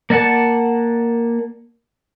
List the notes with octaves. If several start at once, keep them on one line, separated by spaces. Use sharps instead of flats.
A#3 D5 F#5 A5